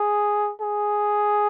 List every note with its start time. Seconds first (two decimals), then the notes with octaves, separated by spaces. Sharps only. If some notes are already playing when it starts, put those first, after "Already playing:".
Already playing: G#4
0.61 G#4